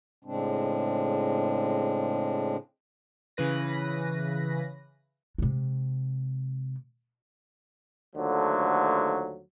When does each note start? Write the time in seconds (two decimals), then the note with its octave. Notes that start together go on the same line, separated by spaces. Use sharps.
0.25 A2 C#3 G#3 C4 D4
3.37 C#3 E3 B4 A#6
5.38 C3 G#3
8.16 D#2 D3 F3 F#3 A3